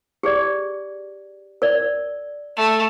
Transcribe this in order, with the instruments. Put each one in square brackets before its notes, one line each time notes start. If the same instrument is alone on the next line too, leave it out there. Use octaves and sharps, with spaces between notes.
[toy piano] G4 G#4 D5
A#4 D5
[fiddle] A3